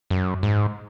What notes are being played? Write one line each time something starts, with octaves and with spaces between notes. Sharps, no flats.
F#2
G#2